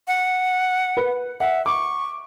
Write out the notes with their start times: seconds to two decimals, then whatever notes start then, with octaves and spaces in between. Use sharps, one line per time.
0.08 F#5
0.97 B4
1.40 E5 F#5
1.66 C#6 D6